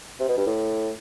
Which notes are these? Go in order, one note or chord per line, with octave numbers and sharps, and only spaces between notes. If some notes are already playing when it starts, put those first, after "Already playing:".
C3
B2
G2
A2